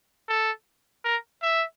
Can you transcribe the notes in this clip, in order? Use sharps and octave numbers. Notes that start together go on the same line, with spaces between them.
A4
A#4
E5